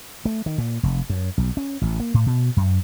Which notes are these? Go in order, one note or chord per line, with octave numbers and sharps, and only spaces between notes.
A3
D#3
A#2
F1
F#2
B1
C#4
A1
A#3
A2
B2
F#2